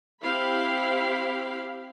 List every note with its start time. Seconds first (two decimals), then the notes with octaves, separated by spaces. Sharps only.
0.23 C4 E4 G4 F5 B5